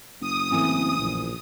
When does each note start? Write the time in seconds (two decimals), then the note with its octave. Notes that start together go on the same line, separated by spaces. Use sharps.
0.21 F#1 D#6
0.51 A2 E3 C4 A4
0.98 A#1